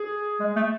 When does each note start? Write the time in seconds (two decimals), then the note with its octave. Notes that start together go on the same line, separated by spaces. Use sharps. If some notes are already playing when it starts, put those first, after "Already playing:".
Already playing: G#4
0.40 G#3
0.56 A3